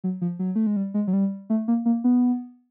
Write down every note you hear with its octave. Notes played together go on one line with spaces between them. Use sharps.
F#3
F3
F#3
A3
G#3
G3
G#3
F#3
G3
A3
A#3
A#3
B3